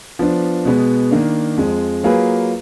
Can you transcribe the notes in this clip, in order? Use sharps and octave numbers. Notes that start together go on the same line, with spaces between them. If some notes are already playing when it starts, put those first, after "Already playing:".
F3 B3 D4
B2 G#3 B3
D#3 A#3 D4
F2 F3 G#3
F#3 A#3 F4 G#4 B4